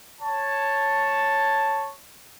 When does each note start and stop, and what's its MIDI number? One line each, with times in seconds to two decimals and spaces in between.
0.22 1.91 73
0.22 1.91 81